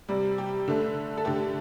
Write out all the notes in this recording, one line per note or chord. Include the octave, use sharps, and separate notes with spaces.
C3 G3
G4
D3 A3
A4
D3 A3 G4